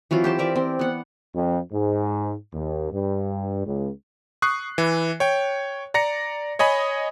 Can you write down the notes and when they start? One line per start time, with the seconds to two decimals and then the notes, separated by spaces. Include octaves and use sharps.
0.11 E3 F#3 C4 F4
0.24 G4 C5 A5
0.39 A#4 D5 E5
0.56 C4
0.79 B3 F#5
1.34 F2
1.72 G#2
2.53 D#2
2.91 G2
3.66 C#2
4.42 C#6 D#6 F#6 C7
4.78 E3
5.20 C#5 G5
5.94 D5 A#5 A#6 C#7
6.59 C#5 D#5 G#5 B5